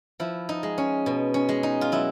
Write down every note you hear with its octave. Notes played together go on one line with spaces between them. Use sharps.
F3 E4
D#4
G#3
C#4
B2
C#4
G#3
D#4
F4
F#3 E4